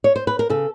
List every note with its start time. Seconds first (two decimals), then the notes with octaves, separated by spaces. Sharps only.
0.04 C#5
0.16 C5
0.27 B4
0.39 A#4
0.50 C#3 A4